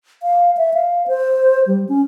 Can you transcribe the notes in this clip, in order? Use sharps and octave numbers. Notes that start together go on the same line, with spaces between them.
F5
E5
F5
C5
G3
C#4